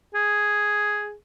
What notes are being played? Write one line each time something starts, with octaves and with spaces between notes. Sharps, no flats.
G#4